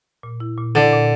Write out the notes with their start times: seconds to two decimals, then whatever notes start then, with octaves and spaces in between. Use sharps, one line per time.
0.23 A#2
0.40 E4
0.58 A#2
0.75 D3 E4
0.93 A#2